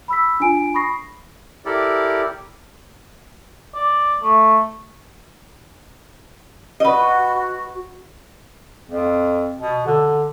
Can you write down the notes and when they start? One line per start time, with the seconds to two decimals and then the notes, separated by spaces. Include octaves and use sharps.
0.08 B5 E6 B6
0.40 D4 F4 G#5 D7
0.74 B5 C#6 D#6 A#6 C7
1.66 E4 G4 A4 A#4 D5
3.75 D5
4.21 A3
6.80 F#4 B4 D#5
8.90 F2
9.59 B2
9.86 D3